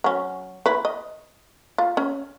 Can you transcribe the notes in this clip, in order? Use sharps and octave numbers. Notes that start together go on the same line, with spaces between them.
F#3 C#4
E4 B4
D#5
F4
C#4